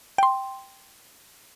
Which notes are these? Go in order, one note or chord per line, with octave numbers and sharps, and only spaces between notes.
G5 C6